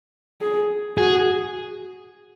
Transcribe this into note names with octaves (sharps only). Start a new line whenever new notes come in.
G#4
F#4 G#4